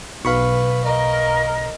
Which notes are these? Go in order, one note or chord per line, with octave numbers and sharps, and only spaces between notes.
B1 B4 F5 B5 C#6
A#4 D#5